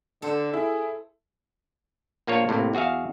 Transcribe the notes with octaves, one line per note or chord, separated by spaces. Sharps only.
D3 A4 C5
E4 G#4
A#1 A#3 F4 C5 C#5
A2 C3 A#3
E2 F#4 G#4 E5 F5